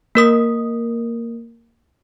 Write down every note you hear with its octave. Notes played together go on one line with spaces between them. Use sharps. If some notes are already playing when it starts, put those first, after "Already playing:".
A#3 A#4 D#6 B6